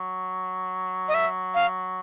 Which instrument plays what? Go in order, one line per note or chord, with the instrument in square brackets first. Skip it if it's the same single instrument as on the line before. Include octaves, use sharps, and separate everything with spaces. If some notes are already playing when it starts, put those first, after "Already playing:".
Already playing: [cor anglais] F#3
[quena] D#5
E5
F5